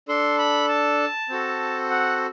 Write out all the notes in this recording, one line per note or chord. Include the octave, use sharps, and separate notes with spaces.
D4 A4 C6
B5
A5
C4 F#4 A4
F#5